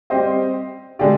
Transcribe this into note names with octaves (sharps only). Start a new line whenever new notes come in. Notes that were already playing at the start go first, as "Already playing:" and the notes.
G3 C4 G4 C5 D#5
D3 G#3 D4 G4 D5